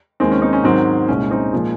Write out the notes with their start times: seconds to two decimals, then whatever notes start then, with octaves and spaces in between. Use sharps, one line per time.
0.20 D#2 D#3 G#3 C4
0.31 C#4
0.42 C4 D#4
0.53 C#4
0.63 G#2 D#3 F#3 C4
1.08 C2 A#2 G#3 C#4
1.31 C4 D#4
1.53 A#2 F3 G#3